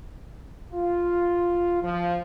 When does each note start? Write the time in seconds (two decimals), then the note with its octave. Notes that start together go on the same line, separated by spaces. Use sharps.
0.73 F4
1.83 F3